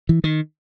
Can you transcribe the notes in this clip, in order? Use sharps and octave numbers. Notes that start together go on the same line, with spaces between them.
E3
D#3